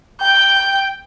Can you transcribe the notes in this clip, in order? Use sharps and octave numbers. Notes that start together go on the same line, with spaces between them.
G5 G6